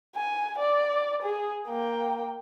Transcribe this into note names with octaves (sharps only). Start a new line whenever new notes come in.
G#5
D5
G#4
A#3 G5